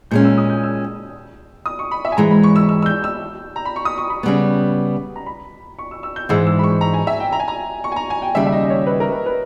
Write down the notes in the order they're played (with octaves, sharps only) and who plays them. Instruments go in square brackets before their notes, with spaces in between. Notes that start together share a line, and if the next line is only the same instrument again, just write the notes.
[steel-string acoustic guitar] A#2 G#3 C#4 [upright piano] G6
[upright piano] E6
D#6
G6
E6
D#6
C#6
B5
E5
G#5
[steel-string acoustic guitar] G#2 E3 G#3 [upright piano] A#5
[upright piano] B5
C#6
E6
E6
E6
G6
E6
A#5
B5
C#6
D#6
C#6
B5
[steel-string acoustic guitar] C#3 G3 B3
[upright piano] A#5
B5
C#6
E6
E6
G6
[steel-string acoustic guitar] G#2 E3 G#3 [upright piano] E6
[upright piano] E6
B5
C#6
A#5
G#5
E5
G5
A#5
G#5
A#5
C#6
G#5
A#5
G#5
G5
[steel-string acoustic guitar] D#2 C#3 G3 [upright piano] E5
[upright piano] E5
D#5
D#5
C#5
B4
A#4
B4
B4